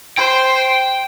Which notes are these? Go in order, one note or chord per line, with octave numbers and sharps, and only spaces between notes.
C5 G5